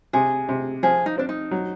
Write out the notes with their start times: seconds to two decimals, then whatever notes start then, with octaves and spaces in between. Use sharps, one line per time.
0.13 C3 G#4
0.49 C3
0.83 F3 G#4
1.06 D#4
1.18 C4 D4
1.29 D#4
1.51 F#3